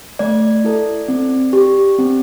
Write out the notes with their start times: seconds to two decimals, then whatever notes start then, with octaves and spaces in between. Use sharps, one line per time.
0.19 A3 D5
0.64 E4 A4
1.08 C4
1.53 G4
1.99 C4